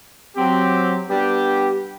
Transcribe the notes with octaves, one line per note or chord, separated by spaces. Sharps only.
F#3 C4 G4
G3 B3 D4 G4